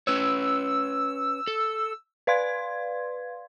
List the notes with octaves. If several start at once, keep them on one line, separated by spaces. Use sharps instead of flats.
C#4 B4 C#5 E6
A4
B4 D5 F5 C6 G#6